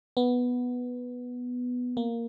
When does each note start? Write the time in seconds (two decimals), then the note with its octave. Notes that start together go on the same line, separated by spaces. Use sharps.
0.17 B3
1.97 A#3